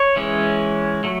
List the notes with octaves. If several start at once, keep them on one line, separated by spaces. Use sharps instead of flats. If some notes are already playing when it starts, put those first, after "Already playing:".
Already playing: C#5
E3 G#3 C#4
F#3 A3